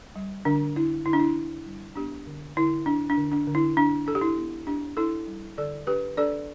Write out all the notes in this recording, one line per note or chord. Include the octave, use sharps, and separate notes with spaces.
G3
D3 D4
D3 E4
D3 E4
D4
E4
D4
G3
B3 D4 G4
D3
D3 E4
D4
D4
D3
D4
D3
E4
D4
D4 A4
G4
E4
B3
D4 G4
D4 E4 A4
G3
D3 A4 D5
D4 G4 B4
D4 A4 D5